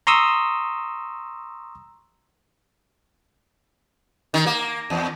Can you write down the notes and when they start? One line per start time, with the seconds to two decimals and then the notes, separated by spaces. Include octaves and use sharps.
0.07 A#5 C6 C#6 D#6 E6
4.34 D#3
4.46 A#3
4.90 E2